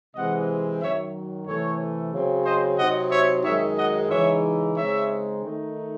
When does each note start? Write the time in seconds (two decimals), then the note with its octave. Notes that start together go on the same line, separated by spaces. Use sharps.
0.15 C3 E3 G#3 C4 D#5 F#5
0.81 F#2 D#3 F#3 C#5 E5
1.47 C3 E3 A3 A4 C#5
2.12 C#3 F#3 C4
2.45 C5 D#5
2.78 C3 F#3 C4 D#4 D#5 F#5
3.11 C#5 E5
3.43 F#2 D#3 G#3 D#4 C#5 E5
3.77 D#5 F#5
4.09 C#3 E3 G#3 D#4 C#5 E5
4.75 C#3 G#3 C4 D#4 C#5 E5
5.41 D#3 A3 D#4